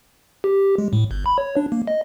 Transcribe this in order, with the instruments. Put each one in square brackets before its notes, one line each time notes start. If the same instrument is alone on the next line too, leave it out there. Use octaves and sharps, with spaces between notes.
[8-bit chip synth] G4
G#3
A2
G1
B5
C#5
D4
A#3
D#5